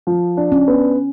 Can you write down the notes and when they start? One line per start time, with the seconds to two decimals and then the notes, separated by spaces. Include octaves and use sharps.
0.07 F3
0.37 D4
0.52 C#4
0.68 B3